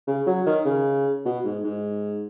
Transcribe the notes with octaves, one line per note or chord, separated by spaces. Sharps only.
C#3
F#3
D#3
C#3
B2
G#2
G#2